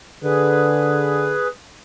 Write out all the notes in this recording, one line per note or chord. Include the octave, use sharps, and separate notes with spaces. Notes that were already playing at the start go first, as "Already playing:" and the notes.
D3 G#4 B4